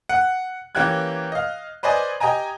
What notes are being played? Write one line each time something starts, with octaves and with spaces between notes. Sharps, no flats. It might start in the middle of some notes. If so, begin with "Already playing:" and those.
F#5
E3 A#3 C#4 G4 F#6 G#6
D#5 F5
B4 C5 D5 D#5 G#5
G4 D#5 G5 G#5 A#5